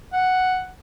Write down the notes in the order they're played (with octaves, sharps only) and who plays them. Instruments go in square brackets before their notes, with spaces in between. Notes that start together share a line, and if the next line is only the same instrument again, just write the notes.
[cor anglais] F#5